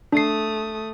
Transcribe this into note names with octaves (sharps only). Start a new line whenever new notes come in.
A3 D4 D#6 C7